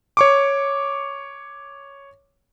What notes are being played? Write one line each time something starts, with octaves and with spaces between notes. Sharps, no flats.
C#5 C#6 D6